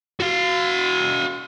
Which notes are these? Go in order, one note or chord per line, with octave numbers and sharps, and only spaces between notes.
F#4 F5